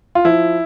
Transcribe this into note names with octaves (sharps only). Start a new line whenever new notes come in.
F4
F3 E4